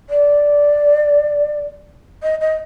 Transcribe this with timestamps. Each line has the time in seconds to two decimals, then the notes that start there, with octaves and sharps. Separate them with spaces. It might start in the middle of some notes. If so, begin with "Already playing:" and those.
0.10 D5
2.23 D#5
2.41 D#5